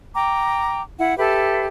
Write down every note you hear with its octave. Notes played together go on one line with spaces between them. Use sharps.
G5 A#5 D6
E4 F#5
G4 A4 B4 E5